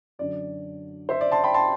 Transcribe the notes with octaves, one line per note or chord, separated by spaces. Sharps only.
F#2 D3 F#3 D5
C5 E5
D5
A5 C6
G5 B5
A5 C6